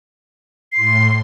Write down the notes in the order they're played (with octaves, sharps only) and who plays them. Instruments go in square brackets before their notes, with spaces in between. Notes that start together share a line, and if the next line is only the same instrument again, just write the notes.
[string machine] A2 C6 [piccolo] C7